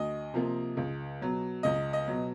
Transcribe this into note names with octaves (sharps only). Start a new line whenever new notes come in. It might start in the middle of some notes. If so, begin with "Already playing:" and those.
Already playing: D2 D#5
C3 F3 A#3
C#2
B2 F#3
C#2 D#5
D#5
B2 F#3